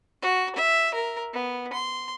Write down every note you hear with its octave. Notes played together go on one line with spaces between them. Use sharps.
F#4
E5
A#4
B3
C6